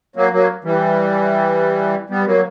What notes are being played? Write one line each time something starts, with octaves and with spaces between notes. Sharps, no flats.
F#3 A#3
F#3 A#3
E3 G3
G3 B3
F#3 A#3